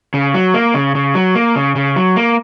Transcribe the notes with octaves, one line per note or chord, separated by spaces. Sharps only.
C#3
F#3
A#3
C#3
C#3
F#3
A#3
C#3
C#3
F#3
A#3